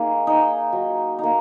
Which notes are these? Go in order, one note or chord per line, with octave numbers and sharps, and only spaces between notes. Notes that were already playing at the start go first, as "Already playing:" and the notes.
Already playing: A#3 D#4 G#4
D#4
F#3
A#3 D#4